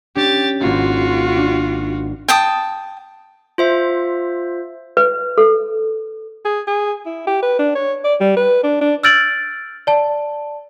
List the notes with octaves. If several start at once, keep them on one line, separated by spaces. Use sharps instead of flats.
C#4 D4 G4 A6
G#1 A#3 F4 F#4
D4
G5 A5 D#6
F4 C5 E5
B4
A4
G#4
G#4
E4
G4
B4
D4
C#5
D5
G3
B4
D4
D4
E6 F6 G6 A6 D7 F#7
D5 A5